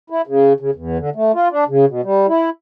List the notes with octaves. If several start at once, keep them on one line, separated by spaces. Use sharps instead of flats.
E4
C#3
C#3
E2
D3
A3
F4
D4
C#3
B2
G3
E4